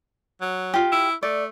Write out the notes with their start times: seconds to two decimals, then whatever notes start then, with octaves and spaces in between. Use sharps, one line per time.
0.41 F#3
0.74 F4 G4
0.92 E4
1.23 A3 D5